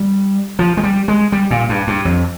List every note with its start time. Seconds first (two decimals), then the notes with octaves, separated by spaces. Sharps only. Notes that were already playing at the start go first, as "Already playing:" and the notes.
Already playing: G3
0.59 F3
0.77 G#3
0.83 G3
1.08 G#3
1.32 G3
1.51 A#2
1.69 G2
1.87 G2
2.05 F2